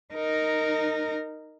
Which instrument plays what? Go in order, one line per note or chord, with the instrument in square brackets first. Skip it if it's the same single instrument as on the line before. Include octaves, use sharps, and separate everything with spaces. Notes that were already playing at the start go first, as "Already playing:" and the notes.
[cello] D#4 A#4